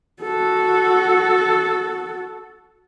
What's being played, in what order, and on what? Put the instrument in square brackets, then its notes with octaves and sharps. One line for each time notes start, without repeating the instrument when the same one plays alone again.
[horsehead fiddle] F#4 A4